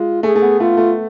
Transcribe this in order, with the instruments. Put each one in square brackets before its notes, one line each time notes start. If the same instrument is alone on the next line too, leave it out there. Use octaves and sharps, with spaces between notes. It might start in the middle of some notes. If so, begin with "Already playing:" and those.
Already playing: [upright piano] G#3 [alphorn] F4
[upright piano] A3 [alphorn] G#4
[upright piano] A3
B3
[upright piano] A3 [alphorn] F4
[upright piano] A3